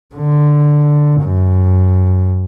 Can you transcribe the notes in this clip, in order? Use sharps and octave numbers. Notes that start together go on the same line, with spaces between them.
D3
F#2